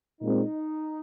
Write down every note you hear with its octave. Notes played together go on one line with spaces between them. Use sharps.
A#2 G#3 C4 D#4